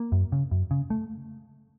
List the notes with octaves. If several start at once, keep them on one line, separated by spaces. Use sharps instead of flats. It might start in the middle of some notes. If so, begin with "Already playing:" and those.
Already playing: A#3
F#2
C#3
F#2
C#3
A3